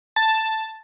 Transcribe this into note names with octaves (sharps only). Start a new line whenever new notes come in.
A5